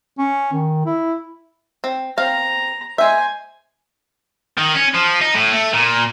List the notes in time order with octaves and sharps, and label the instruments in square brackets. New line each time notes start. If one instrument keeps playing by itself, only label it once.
[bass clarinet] C#4
D#3
E4
[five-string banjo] C4
[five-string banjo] C4 F5 [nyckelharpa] A#5
[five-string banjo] G#3 E5 [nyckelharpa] C5 G#5
[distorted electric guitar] D#3
C#4
F3
D#4
A2
A3
A#2